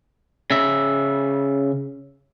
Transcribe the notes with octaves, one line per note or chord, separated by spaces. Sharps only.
C#3 E5